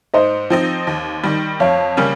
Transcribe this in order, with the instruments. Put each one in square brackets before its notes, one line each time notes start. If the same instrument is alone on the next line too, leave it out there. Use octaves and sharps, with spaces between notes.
[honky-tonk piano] G#2 [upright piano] C5 D#5
[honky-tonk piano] F3 C4 D#4
D#2
D#3 G3
[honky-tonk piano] F2 [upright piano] C#5 F5
[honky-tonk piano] C#3 G3 A#3 C#4